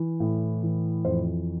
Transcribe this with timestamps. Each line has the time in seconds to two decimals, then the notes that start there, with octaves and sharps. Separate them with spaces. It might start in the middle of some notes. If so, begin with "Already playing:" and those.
Already playing: E3
0.20 A2
0.63 E3
1.05 F2 C5